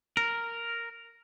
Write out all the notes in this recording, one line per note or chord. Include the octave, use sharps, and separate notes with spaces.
A#4